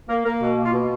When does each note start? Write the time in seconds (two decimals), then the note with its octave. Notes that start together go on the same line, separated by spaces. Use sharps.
0.09 A#3 A#4
0.25 A#3 A#4
0.41 B2 F#4
0.57 A#3
0.65 F4
0.73 B2